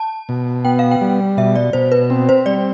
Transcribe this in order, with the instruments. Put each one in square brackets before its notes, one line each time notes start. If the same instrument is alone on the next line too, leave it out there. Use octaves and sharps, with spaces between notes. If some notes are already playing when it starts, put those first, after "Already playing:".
Already playing: [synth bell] A5
[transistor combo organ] B2
[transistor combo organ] B3 [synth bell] G5
[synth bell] F5
G5
[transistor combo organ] G3
[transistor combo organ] B2 [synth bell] E5
[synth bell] D5
[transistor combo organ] B2 [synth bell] C5
[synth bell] B4
[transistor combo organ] C4
[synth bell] C5
[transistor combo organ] G3 [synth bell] D5